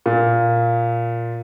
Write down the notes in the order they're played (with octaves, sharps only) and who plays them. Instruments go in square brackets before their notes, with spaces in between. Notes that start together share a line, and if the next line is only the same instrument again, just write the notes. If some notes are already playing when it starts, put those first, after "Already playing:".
[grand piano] A#2